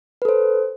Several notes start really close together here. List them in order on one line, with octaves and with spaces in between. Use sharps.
B4 A4 C5